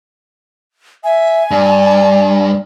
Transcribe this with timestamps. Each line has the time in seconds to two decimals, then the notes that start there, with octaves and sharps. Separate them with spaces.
1.04 E5 G#5
1.51 G2 D5